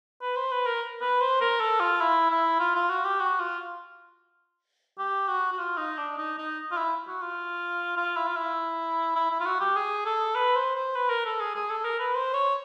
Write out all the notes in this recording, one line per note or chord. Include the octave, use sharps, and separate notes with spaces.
B4
C5
B4
A#4
B4
C5
A#4
A4
F4
E4
E4
F4
F4
F#4
G4
F#4
F4
G4
F#4
F#4
F4
D#4
D4
D#4
D#4
F4
E4
F#4
F4
F4
E4
F4
E4
E4
E4
F4
F#4
G4
G#4
A4
B4
C5
C5
B4
A#4
A4
G#4
G#4
A4
A#4
B4
C5
C#5